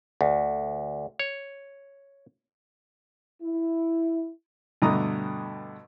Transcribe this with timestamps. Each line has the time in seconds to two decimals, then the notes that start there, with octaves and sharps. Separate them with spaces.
0.21 D2
1.19 C#5
3.43 E4
4.82 G2 B2 D3 A3 A#5 D#6